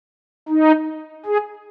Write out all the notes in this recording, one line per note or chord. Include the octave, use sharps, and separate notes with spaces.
D#4
G#4